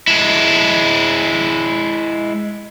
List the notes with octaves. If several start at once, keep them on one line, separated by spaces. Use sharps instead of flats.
G#3 E4